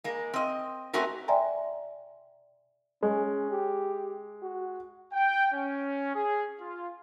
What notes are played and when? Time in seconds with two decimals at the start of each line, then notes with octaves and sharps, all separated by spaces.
0.04 G#3 A#3
0.34 C4 D#5
0.93 A3 C4 C#4 F#4 A#4
1.28 D5 E5 G5 G#5 A#5 C6
3.03 G#3 C#4
3.51 G4
4.42 F#4
5.12 G5
5.52 C#4
6.15 G#4
6.59 F4